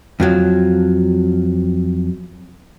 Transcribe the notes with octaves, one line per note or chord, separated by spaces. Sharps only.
F2 F3 F#3